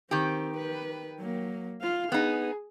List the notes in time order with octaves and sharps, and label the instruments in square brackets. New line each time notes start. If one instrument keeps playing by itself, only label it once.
[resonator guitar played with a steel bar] D#3 G4 [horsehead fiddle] C4
[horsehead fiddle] B4
F#3 A#3
F4 F5
[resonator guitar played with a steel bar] B3 D#4 [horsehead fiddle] G#4